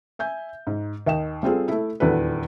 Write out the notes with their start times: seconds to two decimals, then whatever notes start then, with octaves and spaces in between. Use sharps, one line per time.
0.19 E5 G#5 G6
0.67 G#2
1.07 D#2 D#5 G5 E7
1.43 G3 C4 F4 G#4 A4
1.68 A3 E4
2.00 D#1 E2 D4 F#4 A4 B4